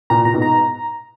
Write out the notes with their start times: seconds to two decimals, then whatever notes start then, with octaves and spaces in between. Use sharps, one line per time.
0.10 A#2 A#5
0.25 A#2 A#5
0.33 G#2 B2
0.42 A#5